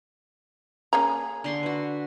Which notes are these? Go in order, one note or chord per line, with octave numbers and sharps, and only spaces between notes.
A#3 C#4 G#4 A#5
D3 C6 C#6
F#4 B4